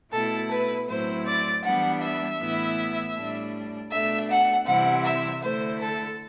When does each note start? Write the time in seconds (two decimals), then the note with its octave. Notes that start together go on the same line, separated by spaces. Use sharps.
0.12 B2 A3 E4 A4
0.50 B4
0.88 A2 F#3 C4 E4 C5
1.25 D5
1.63 E3 G3 B3 D4 F#5
2.01 E5
2.39 A2 E3 B3 E4
3.15 A2 G3 D4
3.91 B2 A3 D4 E5
4.29 F#5
4.66 C3 E3 G3 C4 E4 F#5
5.04 E5
5.42 D3 A3 E4 C5
5.80 A4